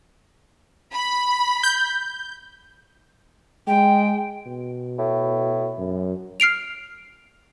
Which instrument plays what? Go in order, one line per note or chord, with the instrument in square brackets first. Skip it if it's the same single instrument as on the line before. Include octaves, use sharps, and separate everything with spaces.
[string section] B5
[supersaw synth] G6
[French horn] G#3 [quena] G5
[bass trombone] B2
[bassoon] A2
[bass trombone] F#2
[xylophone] F6 C7 D7 F7